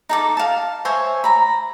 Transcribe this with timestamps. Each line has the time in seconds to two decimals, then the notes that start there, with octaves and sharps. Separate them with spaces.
0.09 D#4 A4 D6
0.37 F5 A5
0.85 C5 C#5 E5 G#5
1.24 A#5 B5